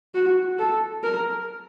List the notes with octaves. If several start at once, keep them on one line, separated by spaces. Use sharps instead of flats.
F#4
A4
A#4